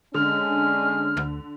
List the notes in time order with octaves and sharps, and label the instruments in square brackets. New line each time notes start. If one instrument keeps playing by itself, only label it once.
[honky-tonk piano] D3 [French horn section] G#3 C#4 D4 [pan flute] F6
[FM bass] D2